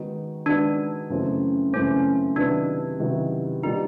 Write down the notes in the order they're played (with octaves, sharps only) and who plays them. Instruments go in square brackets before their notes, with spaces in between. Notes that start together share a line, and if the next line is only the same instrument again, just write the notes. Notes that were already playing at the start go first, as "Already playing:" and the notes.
Already playing: [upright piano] D#3 G#3 B3 D#4 F#4
[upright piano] D#3 G#3 B3 D#4 F#4 [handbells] D4
[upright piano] F#2 C#3 E3 A3 C4
[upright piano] F#2 C#3 E3 A3 C4 [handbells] C#4
[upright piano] C3 D#3 F#3 B3 E4 [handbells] D4
[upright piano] C3 D#3 F#3 B3 E4
[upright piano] B2 G3 A#3 D4 F4 [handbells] D#4